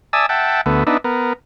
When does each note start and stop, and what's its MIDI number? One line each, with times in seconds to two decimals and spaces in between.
0.13 0.26 74
0.13 0.26 76
0.13 0.26 80
0.13 0.26 81
0.13 0.26 87
0.13 0.26 88
0.29 0.61 76
0.29 0.61 78
0.29 0.61 79
0.29 0.61 81
0.66 0.84 38
0.66 0.84 57
0.66 0.84 59
0.87 0.97 59
0.87 0.97 62
0.87 0.97 63
0.87 0.97 76
1.04 1.33 59
1.04 1.33 70